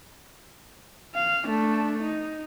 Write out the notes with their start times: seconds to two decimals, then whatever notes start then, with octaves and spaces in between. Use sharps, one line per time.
1.15 F5
1.46 A3 D4
2.02 D#4